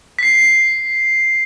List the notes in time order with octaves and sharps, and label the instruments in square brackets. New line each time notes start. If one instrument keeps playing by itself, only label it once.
[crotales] B6 C7